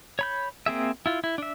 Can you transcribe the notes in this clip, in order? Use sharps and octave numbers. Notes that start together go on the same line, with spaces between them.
C#5 B5 G6
A#3 C4 G#4 E5
E4 F4
E4
D4 E5